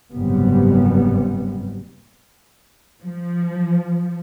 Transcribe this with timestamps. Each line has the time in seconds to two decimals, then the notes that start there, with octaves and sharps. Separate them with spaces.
0.13 F#1 G#2 C3 G3 B3
3.03 F3